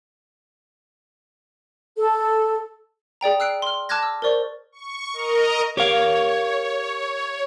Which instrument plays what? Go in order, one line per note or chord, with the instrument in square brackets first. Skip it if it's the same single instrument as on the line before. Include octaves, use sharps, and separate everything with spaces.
[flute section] A4
[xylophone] G#4 D5 G5 A#5
E6 F#6 C7 D7
C6 F6
A5 D6 F6 F#6 G#6 A#6
E6
A#4 C5 D5 C#6
[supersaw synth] C#6
A#4 D#5 A#5
[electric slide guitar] G4 A#4 F5 [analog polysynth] C#5